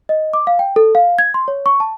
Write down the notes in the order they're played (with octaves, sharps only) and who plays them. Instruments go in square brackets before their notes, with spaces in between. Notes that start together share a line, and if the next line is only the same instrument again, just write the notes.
[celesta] D#5
D6
F5
G5
A4
F5
G#6
C6
C#5
C#6
A5